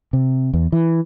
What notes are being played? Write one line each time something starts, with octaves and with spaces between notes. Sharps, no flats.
C3
E2
E3